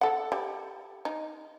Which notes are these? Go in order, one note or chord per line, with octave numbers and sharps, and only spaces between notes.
A4 F#5
G3
D#4